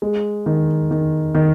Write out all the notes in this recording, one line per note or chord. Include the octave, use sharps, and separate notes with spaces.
G#3
D#3
D#3
D#3